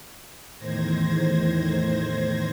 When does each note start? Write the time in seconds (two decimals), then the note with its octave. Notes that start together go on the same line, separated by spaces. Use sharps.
0.57 E2 A2 D#3 C5 G#6 A#6